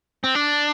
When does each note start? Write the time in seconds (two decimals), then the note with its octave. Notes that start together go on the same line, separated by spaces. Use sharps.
0.24 C4
0.35 D4